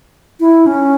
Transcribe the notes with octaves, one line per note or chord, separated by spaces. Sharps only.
E4
C#4